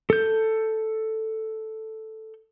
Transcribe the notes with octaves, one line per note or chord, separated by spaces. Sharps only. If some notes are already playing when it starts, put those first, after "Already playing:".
A4 G6